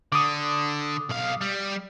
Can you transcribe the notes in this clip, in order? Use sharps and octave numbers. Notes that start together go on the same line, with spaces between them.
D3 D6 D#6
B1 F5
G3